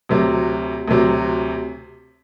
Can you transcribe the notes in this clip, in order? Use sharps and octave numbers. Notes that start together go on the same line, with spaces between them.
D2 C3 F#3
D2 C3 F#3